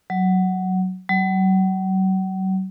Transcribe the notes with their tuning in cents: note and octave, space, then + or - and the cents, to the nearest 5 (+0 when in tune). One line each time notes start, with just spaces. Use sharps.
F#3 +10
F#3 +40